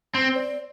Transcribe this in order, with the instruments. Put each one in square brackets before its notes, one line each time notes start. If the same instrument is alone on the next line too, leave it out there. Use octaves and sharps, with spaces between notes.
[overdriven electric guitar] C4 [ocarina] C5
[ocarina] D5